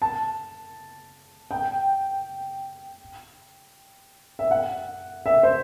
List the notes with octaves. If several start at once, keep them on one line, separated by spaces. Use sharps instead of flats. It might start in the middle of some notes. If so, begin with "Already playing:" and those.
A5
G5
E5
F#5
E5
C5